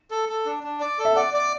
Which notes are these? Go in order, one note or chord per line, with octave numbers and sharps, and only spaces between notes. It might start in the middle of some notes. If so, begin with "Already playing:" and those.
A4
A4
D4
D4
D5
A4
E5
D5 F#5
D5